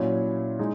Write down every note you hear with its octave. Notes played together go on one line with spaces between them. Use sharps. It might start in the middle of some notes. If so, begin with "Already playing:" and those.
Already playing: A#2 F#3 C#4 E4
G#3 D#4